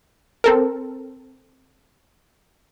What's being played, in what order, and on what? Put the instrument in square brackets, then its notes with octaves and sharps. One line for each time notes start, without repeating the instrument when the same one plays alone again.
[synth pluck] C4 A4 A#4